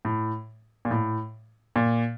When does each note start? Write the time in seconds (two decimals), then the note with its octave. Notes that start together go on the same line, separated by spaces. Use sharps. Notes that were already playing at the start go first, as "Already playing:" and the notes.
0.05 A2
0.85 A#2
0.91 A2
1.76 A#2